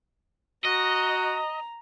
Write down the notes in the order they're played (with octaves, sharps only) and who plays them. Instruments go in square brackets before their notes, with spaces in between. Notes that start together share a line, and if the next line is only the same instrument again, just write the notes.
[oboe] F#4 [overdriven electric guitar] D#5 [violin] A#5